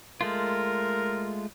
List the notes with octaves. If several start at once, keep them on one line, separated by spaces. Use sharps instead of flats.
G#3 A3 F4 A#4